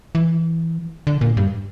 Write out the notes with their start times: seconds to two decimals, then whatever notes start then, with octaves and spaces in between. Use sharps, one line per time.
0.15 E3
1.07 D3
1.21 A#2
1.37 G2